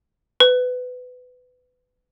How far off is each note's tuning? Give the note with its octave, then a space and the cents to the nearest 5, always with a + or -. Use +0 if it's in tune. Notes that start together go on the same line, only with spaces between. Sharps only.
B4 +20